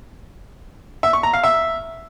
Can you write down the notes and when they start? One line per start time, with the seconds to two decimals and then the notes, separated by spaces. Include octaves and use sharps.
1.03 E5
1.13 C#6
1.23 A#5
1.33 F5
1.44 E5